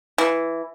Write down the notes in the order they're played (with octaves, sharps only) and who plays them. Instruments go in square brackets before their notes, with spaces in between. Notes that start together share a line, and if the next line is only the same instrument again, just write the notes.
[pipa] E3